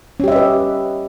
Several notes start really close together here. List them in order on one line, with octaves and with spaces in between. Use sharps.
C#4 G4 E5 D#5 B4